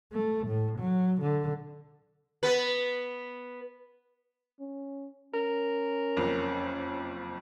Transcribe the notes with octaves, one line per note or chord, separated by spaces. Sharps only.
A3
A2
F#3
D3
B3 B4
C#4
C#4 A#4
F#1 F2